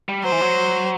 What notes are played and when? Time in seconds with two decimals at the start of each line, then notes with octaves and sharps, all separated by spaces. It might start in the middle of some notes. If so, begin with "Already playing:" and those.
0.09 G3
0.24 F#3 C5
0.32 E3
0.41 F#3